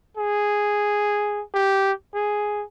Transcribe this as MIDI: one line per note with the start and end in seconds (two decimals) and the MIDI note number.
0.17 1.42 68
1.55 1.92 67
2.15 2.64 68